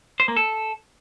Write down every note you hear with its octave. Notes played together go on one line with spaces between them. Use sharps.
C5
A#3
A4